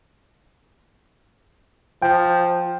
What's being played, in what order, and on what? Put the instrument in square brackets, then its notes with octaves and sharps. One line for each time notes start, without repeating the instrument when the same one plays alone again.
[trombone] F3 [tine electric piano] G5